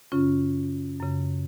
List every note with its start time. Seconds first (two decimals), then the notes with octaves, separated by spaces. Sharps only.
0.12 F#2 C#3 C#4 F4
1.00 F#2 C#3